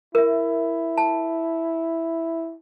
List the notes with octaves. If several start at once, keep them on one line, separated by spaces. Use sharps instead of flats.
E4 A#4 E5
A5